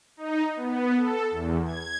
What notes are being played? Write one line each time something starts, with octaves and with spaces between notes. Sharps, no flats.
D#4
B3
A4
E2
G#6